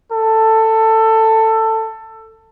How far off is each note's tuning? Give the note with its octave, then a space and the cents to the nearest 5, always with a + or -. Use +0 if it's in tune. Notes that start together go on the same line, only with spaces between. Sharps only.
A4 +15